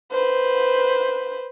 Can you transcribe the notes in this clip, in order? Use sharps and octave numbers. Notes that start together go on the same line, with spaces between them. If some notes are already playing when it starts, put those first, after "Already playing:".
B4 C5